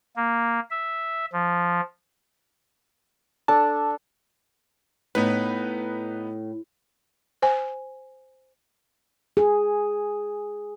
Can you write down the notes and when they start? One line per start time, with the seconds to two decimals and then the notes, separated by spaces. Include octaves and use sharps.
0.16 A#3
0.70 E5
1.33 F3
3.48 D4 A4 A5
5.15 A2 B3 D#4 B4
7.42 C5 G#5
9.37 G#4